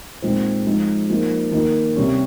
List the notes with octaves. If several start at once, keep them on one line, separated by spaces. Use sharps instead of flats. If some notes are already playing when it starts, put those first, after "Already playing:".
A#2 G#3 C4 D#4
F3 G#3 D#4
F3 A#3 D#4
D#3 A#3 D#4
C3 G3 C#4